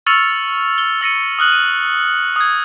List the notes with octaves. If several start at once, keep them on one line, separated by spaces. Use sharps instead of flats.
C#6 E6 F6 A6 C#7 F7
G7
E6 A#6 C#7 D#7
D#6 F6 F#6 F#7
D#7
D#6 G#6